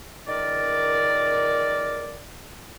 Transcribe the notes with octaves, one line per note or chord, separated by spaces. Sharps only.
C#2 D#3 A#4 D5